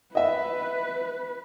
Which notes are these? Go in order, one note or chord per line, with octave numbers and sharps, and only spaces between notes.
B4 D#5 E5